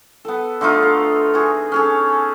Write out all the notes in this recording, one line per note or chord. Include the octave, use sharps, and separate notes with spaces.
B3 A4
D3 A3 D#4 F4
A4
F#4 G#4
C#4 G#4 A4